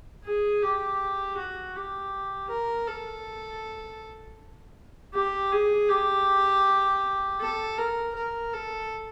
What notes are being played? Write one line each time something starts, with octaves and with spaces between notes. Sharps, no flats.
G#4
G4
F#4
G4
A#4
A4
G4
G#4
G4
A4
A#4
A#4
A4